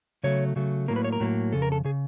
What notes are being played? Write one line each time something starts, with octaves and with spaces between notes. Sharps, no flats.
C#3 F#3 A3 C#5
C#3 F#3 A3
A2 F#3 A#3 A#4
B4
C#5
A#4
A2 F#3 A#3
F2 C#3 A4
A#4
A4
C#3 G#4